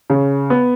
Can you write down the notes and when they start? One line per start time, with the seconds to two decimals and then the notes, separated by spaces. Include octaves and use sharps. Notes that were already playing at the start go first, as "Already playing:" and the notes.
0.10 C#3
0.50 B3